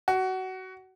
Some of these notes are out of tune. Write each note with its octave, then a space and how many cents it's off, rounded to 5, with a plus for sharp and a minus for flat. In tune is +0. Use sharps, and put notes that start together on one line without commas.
F#4 +20